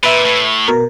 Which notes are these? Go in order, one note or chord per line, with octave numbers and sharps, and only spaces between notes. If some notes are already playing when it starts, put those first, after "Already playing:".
A#2 B4 E5
A2
B2 A#4